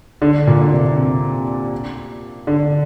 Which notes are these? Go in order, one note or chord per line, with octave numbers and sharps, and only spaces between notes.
D3
A#2
D3
C3
C3
D3